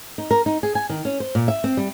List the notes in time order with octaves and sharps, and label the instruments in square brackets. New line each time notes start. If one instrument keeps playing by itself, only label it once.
[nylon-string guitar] D#4
A#4
D#4
G#4
G#5
D#3
C#4
C5
A#2
E5
C4
G3